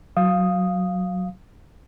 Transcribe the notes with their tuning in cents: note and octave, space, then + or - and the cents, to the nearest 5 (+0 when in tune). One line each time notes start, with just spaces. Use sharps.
F#3 +0 F5 +0 D#6 +0